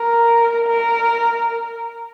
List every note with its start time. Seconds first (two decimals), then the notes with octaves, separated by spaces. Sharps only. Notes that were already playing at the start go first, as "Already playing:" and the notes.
Already playing: A#4
0.67 A#4